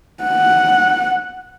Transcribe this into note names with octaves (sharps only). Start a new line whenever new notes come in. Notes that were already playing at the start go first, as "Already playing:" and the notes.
F#5